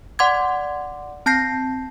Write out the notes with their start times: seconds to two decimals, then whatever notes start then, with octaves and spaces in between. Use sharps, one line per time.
0.19 D5 F#5 C6 D6 G#6
1.26 C4 A5 G6 A#6 C7